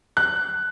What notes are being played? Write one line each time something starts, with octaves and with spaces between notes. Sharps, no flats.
F#6